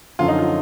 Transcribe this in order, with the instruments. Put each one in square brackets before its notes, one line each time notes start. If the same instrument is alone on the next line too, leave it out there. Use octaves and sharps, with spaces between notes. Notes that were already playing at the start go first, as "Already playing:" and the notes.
[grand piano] F#2 D3 F3 F4
D#4
F4